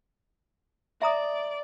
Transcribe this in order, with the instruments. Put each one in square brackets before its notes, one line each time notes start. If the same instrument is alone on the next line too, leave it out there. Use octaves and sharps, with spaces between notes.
[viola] D5 [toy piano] E5 A#5 D#6